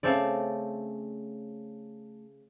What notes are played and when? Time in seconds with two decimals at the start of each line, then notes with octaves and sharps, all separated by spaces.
0.03 C#3 A3 C4 D5